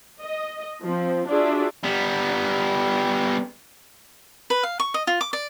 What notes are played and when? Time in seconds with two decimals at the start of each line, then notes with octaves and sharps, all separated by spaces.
0.21 D#5
0.83 F3 C4
1.28 D4 F4 F#4 G#4 D5 E5
1.84 G3 B3
4.50 B4
4.63 F5
4.80 C#6
4.94 D#5
5.07 F4
5.21 D6
5.33 D5